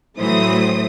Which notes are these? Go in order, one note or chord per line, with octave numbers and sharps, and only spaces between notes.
A2 E3 F#3 A3 C5 D#6